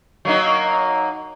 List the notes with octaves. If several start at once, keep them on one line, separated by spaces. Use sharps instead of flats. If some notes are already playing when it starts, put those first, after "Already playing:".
F#3 A#3 D#4